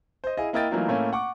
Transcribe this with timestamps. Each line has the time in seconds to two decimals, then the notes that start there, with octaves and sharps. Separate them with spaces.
0.24 C5 D#5
0.37 E4 G#4 D#5 F5
0.53 A#3 E4 A#4 D#5 G5 A6
0.71 E3 F#3 A3 A#3 D#4 F4
0.88 A2 A3 A#3 C#4
1.13 F#5 C#6 D6